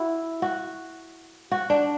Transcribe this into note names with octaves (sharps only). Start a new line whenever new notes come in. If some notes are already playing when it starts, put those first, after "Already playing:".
Already playing: E4 F#4
F#4
F#4
D4